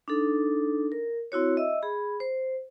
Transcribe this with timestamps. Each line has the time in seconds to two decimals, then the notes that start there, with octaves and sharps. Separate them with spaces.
0.08 D4 D#4 A4
0.92 A#4
1.32 C4 E4 F#4 C#5
1.57 D#5 E5 E6
1.82 G#4 B5
2.20 C5